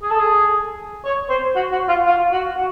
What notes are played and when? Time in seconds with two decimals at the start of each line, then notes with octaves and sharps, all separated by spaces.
0.02 G#4
0.11 A4
0.20 G#4
1.05 C#5
1.29 C5
1.56 F#4
1.72 F#4
1.89 F4
2.06 F4
2.32 F#4
2.57 F#4